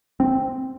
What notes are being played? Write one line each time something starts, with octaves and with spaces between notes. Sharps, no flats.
C4